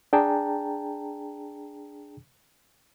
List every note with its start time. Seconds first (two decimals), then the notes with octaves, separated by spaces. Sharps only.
0.13 D4 G#4 G5 A5 A#5